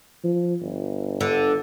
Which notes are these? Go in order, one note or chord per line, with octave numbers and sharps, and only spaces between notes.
F3
G1
D3